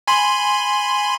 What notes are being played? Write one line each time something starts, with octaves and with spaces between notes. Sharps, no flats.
G#5 B5 C6